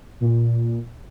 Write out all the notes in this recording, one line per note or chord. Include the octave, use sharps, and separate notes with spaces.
A#2